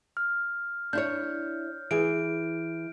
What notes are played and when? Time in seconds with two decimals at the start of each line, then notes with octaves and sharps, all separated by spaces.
0.17 F6
0.93 D4 E4 C#5 G6
1.91 E3 G#4 G#5 D7